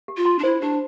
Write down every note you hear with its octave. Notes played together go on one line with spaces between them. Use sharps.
G4
F4
C6
D4
E4 C5
D4 G4